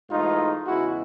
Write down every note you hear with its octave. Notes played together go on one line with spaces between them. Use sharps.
G#2 E3 A3 D#4 F4
E2 C#3 E3 G#3 E4 F#4